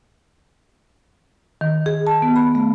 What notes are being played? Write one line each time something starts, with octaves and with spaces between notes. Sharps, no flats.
D#3
G#4
A5
B3
B5
A3